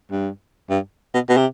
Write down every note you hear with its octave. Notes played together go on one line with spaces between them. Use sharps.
G2
G2
B2
B2
C3